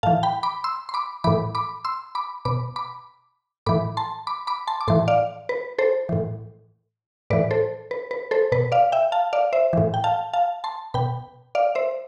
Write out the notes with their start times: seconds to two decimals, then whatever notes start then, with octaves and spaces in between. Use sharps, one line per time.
0.03 A2 E3 F5 A5
0.23 G5 B5
0.43 B5 D6
0.64 C6 E6
0.89 C6
0.94 B5 D6
1.24 A2 E3 B5 D6
1.55 B5 D6
1.85 C6 E6
2.15 B5 D6
2.45 B2 B5 D6
2.76 B5 D6
3.66 A2 E3 B5 D6
3.97 A5 C6
4.27 B5 D6
4.47 B5 D6
4.68 A5 C6
4.81 D6
4.88 A2 E3 A5 C6
5.08 D5 F5
5.49 B4
5.78 A4 C5
6.09 A2 E3
7.30 A2 E3 B4 D5
7.51 A4 C5
7.91 B4
8.11 B4
8.31 A4 C5
8.52 B2 B4
8.72 D5 F5
8.92 E5 G5
9.12 F5 A5
9.33 D5 F5
9.53 C5 E5
9.73 A2 E3
9.94 G5
10.04 F5 A5
10.33 F5 A5
10.64 A5 C6
10.94 B2 G5 B5
11.55 D5 F5
11.75 C5 E5